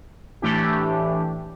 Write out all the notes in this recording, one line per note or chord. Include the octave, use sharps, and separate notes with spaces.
A2 E3 A3 D4 G4